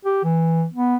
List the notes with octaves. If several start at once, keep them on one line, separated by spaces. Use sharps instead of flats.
G4
E3
B3